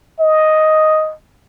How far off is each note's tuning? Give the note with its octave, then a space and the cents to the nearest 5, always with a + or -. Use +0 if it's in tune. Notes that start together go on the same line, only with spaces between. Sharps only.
D#5 +5